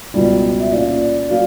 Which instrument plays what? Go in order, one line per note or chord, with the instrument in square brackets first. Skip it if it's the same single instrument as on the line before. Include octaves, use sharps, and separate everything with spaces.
[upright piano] C#2 B2 G3 [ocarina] D5
[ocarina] E5
[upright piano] A#2 A#3 C#4 [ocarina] D5
[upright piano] F#3 A#3